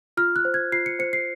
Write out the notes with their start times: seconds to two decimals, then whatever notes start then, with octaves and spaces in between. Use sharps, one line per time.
0.17 F4 F6
0.36 F#6
0.45 C5
0.54 G#6
0.72 F4 C7
0.86 C#7
0.99 C5 C#7
1.13 C7